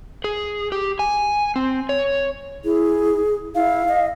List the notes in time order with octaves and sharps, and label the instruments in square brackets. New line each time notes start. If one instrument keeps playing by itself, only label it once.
[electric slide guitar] G#4
G4
G#5
C4
C#5
[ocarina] E4 [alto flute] G#4
[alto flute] E4 [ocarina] F5
[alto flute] D#5